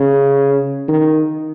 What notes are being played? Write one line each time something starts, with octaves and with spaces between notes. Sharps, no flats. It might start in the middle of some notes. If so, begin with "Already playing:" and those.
Already playing: C#3
D#3